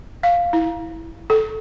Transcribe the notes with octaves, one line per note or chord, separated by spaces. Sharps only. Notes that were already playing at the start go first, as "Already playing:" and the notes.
F5
E4
A4